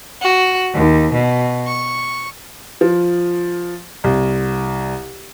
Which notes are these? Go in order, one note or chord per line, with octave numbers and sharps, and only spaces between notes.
F#4
D#2
B2
C#6
F3
C2